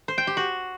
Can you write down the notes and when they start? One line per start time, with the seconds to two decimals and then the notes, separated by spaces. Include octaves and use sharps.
0.08 C5
0.18 G5
0.27 G4
0.37 F#4